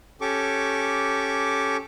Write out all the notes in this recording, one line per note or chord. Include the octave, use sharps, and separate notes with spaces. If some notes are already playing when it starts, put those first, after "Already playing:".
C#4 G4 A4 C#6 D6